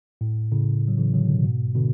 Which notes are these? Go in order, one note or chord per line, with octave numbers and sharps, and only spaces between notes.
A2
A2 C#3
F#3
C#3 E3
D3 F#3
B2 D3
G#2 B2
B2 D3